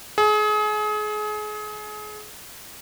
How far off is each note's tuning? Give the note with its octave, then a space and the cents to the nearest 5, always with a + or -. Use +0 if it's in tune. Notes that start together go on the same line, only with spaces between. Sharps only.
G#4 +30